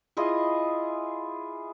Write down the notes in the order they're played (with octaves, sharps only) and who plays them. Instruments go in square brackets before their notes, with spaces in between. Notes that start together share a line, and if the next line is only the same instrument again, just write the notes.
[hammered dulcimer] E4 F4 G#4 D#5